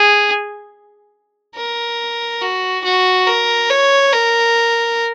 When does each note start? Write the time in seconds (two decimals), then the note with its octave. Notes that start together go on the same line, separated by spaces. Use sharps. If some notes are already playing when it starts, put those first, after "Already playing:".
Already playing: G#4
1.56 A#4
2.42 F#4
2.85 F#4
3.27 A#4
3.70 C#5
4.13 A#4